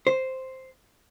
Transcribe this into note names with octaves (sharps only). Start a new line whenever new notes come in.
C5